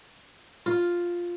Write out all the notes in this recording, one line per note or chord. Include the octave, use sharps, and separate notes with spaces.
F4